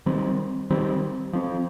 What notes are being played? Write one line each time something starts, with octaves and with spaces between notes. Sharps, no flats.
D#3 G3 C4
D#3 G3 C4
F3 C4